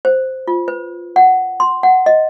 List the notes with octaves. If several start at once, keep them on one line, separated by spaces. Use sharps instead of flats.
C5
F4
B4
F#5
C6
F#5
D#5